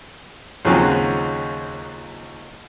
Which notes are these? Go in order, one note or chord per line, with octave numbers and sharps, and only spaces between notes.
D#2 C#3 F3 F#3 C4 C#4